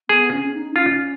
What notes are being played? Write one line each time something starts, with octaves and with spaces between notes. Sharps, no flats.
B3 G#4
C#4
C#4
D#4
C#4 F4